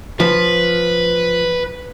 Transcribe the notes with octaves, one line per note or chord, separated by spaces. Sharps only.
F3 B4